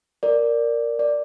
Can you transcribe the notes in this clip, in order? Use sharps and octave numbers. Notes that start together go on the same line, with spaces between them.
A#4 D5
D5